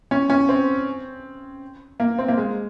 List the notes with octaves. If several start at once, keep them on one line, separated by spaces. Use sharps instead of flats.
C#4
C#4
C4
A#3
C4
A#3
G#3